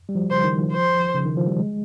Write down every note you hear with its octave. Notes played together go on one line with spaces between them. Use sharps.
G3
F3
C#3 C5
D#3
F3
C5
C#3
D#3
F3
G3
G#3